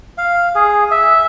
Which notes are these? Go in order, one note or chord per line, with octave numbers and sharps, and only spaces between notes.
F5
G#4
E5